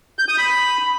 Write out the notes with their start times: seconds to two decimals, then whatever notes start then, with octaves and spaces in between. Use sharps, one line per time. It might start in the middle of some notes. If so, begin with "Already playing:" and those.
0.19 G6
0.28 D#6
0.38 B5